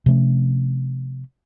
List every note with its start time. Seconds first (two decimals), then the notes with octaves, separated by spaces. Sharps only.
0.06 C3 F3 A3 C#4